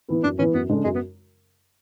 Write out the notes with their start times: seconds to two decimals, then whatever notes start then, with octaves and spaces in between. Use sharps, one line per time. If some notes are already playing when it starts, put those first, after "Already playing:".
0.09 E3 B3 E4 B4
0.23 F#2 D4
0.38 E3 B3 C#4 E4 B4
0.53 F#2 B3
0.69 C#3 G#3 D4 A4
0.84 F#2 G#3
0.95 B3